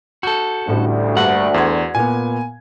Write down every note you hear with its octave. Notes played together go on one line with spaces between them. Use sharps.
F#4 A4 G6
A1 D2 A2 G3
G2 A#3 F#5
E2 D5 C6 G#6
A#2 B3 G#5